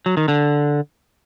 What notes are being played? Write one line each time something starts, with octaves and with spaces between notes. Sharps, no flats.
F#3
D#3
D3